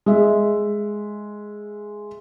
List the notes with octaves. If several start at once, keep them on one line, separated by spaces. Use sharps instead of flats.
G#3 E5